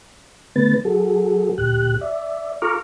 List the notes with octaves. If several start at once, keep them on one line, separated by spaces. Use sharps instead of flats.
D3 A3 B3 B4 A6
F#3 F#4 G#4 A4
D2 A#2 G4 F#6
D5 E5
F4 A4 A#5 C#6 D6 F6